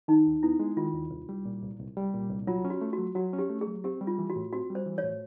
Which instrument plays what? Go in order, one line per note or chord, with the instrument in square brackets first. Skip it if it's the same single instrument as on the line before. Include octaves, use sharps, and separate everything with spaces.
[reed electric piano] D#3 [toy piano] D#4
[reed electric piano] D#2
[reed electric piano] B3 [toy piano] E4
[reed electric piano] G#3
[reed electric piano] D#3 [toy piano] F4
[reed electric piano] D#2
C2
G3
A#2
C2
C2
G3
A#2
C2
[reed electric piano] F#3 [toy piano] F4
[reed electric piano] C#4
[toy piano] F#4
[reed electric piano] A3
[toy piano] F#4
[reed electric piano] F#3
[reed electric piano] F#3 [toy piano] F#4
[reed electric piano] C#4
[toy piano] G4
[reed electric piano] A3
[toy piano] G#4
[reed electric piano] F#3
[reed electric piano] C4 [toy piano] G4
[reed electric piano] G3
[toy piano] F4
[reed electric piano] E3
[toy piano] F#4
[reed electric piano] A2
[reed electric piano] C4 [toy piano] F#4
[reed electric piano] G3
[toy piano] C5
[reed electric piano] E3
[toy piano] C#5
[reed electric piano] A2